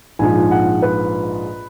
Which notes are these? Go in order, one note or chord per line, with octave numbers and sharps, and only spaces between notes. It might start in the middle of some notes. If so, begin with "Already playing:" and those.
A#1 G#2 F3 G#5
F#5
B4